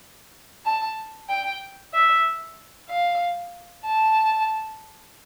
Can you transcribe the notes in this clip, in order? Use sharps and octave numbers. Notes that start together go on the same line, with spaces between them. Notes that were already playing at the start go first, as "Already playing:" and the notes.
A5
G5
E5
F5
A5